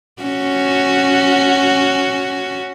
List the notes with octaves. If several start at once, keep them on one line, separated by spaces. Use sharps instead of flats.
C#4 F#4